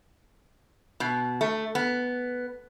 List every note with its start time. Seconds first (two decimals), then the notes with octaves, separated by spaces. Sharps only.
1.00 B2
1.41 A3
1.75 B3